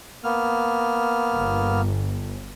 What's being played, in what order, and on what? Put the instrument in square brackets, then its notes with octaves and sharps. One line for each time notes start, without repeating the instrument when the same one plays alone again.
[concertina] A#3 B3 F6
[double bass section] G1